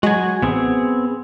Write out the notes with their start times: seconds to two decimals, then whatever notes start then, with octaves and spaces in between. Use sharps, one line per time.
0.03 F#3 G#3 F#4 G#5
0.42 A1 B3 C4 G#4